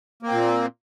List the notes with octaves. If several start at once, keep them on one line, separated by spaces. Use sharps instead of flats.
A#2 A#3 C4